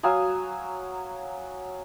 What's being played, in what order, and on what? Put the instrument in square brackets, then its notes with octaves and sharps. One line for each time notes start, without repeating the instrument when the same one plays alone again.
[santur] F#3 F5 G#5 D#6